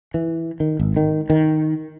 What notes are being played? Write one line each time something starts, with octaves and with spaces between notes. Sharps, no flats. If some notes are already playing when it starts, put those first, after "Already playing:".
E3
D#3
G#1
D#3
D#3